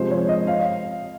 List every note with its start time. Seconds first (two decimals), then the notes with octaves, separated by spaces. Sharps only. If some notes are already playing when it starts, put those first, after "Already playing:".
Already playing: C3 F3 G#3 C5
0.11 C#5
0.29 D#5
0.47 F5